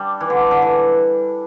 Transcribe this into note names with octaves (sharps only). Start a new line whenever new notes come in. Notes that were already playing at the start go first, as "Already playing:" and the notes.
Already playing: G3 D4
E3
D3
D3
E3